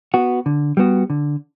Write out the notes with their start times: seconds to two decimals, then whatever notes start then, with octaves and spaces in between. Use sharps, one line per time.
0.14 B3 F#4
0.46 D3
0.77 G3 B3 F#4
1.10 D3